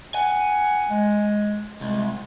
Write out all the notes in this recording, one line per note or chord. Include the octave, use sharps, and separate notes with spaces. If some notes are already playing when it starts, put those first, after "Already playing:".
F#5 G#5
G#3
C2 G#3